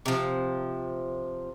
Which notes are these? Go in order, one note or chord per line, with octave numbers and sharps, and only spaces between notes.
C3 F3